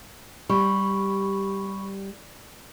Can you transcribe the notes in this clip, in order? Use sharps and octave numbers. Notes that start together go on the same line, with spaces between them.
G3 G4 B5 C#6